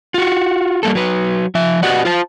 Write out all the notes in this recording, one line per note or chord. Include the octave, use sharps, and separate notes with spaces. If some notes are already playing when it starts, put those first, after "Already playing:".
F4 F#4
G3 A#3 A4
F#3 B4
F3 E5
F#4 G4 B4 D5 D#5 F#5
F4 C5 A5